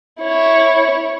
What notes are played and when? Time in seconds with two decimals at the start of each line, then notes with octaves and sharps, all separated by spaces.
0.21 E4 C#5